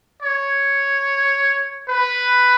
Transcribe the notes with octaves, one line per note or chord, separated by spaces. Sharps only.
C#5
B4